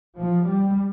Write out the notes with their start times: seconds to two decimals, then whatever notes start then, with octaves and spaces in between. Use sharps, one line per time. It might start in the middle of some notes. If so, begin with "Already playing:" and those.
0.19 F3
0.47 G3